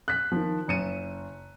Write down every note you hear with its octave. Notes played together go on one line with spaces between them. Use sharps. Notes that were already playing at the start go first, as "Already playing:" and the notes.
F#6 B6
D#3 F3
F#1 C#7 D#7